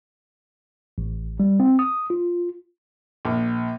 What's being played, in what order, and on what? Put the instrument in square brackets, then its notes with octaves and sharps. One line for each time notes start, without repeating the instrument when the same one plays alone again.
[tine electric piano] A1
G3
C4
D#6
F4
[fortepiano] A#1